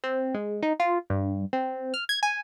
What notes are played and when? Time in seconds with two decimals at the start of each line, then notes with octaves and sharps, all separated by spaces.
0.04 C4
0.34 G#3
0.63 D#4
0.80 F4
1.10 G2
1.53 C4
1.94 F6
2.09 G#6
2.23 G#5